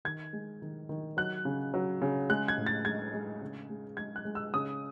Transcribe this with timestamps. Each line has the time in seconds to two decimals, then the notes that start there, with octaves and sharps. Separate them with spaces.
0.05 D#3 G#6
0.33 G#3
0.62 D#3
0.89 D#3
1.17 F#3 F#6
1.45 C#3
1.74 F#3
2.02 C#3
2.30 G#3 F#6
2.48 G#6
2.57 A2
2.66 A6
2.85 G#3 G#6
3.13 G#3
3.41 C#3
3.70 G#3
3.97 G#3 G#6
4.16 F#6
4.25 G#3
4.35 E6
4.54 C#3 D#6